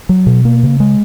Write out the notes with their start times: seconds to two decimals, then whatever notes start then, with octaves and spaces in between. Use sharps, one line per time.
0.09 F#3
0.26 B2
0.45 A#3
0.63 C#3
0.80 G#3